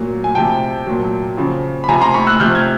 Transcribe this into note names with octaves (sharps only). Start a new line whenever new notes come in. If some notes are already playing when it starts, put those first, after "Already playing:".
Already playing: A#2 F#3
G#5
C3 F3 G5 A5
A#2 F#3
C#3 F3
B5
C3 F3 G#5 A#5
A#5 C6
B5 C#6
E6 F#6
C3 F3 F6 G6
G#6